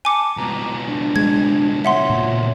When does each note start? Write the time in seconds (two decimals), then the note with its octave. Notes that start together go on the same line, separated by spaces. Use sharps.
0.05 G#5 A5 D6 C#7
0.37 C#2 B2 A#5
0.88 D4
1.16 G#3 G#6
1.85 C#5 E5 F#5 C6
2.10 A#2